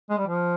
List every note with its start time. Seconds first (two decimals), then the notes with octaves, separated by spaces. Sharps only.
0.10 G#3
0.18 G3
0.27 F3